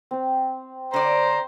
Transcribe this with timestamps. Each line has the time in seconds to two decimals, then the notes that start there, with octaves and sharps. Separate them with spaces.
0.11 C4 G5
0.94 D3 C5 D5 A#5